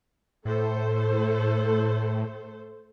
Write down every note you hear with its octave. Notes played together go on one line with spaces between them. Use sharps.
A2 A3 A4 C5